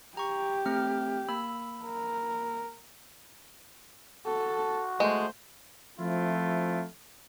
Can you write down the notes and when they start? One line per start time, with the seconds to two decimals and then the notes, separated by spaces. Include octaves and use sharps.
0.17 G4 A#5 C#6
0.66 A3 C4 F6
1.29 A#3 B5 E6
1.85 A#4
4.26 F#4 A4 A5
5.00 G#3 A3 C5
5.98 F3 A3 C4 E4 F4